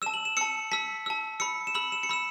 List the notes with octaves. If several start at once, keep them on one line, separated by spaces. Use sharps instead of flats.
A5 E6 E7
F#7
E7
A5 E6 C#7
A5 E6 B6
A5 E6
B5 E6 C#7
E7
B5 E6 F#7
E7
C#7
B5 E6 E7